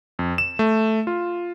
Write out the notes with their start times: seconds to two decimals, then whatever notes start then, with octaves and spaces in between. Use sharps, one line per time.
0.19 F2
0.38 E7
0.59 A3
1.07 F4